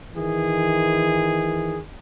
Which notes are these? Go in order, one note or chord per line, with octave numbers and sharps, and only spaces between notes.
D#3 E3 G#4